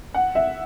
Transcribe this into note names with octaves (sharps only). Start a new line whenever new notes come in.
F#5
E5